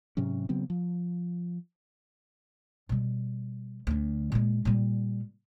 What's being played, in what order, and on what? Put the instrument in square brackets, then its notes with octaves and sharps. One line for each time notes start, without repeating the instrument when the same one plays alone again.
[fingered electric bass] G#2 C3 F#3 C#4
C#3 F#3 B3 C4
F3
[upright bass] B2 G3
D2 D4
A#2 G#3
A#2 G3